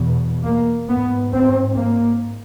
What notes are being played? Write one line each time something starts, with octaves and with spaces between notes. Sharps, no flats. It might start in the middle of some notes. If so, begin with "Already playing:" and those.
Already playing: E2 B2
A#3
G#2 B3
C4
A#3